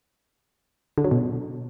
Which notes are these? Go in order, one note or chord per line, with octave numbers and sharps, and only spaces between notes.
D3
F#3
B2